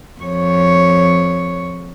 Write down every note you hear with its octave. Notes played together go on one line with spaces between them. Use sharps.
F2 C#5